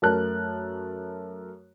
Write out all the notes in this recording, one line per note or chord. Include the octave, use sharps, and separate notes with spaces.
F#2 A3 A#4 A5 F#6